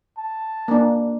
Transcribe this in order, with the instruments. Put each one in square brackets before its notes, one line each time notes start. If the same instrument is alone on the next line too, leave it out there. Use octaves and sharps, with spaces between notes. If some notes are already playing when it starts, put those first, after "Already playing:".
[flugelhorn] A5
[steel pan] A#3 D4